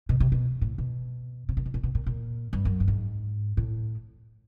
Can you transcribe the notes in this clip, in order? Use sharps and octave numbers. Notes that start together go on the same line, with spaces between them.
B2
C3
B2
A2
B2
C3
A#2
B2
A#2
B2
A#2
A#2
G2
F#2
G2
G#2
A2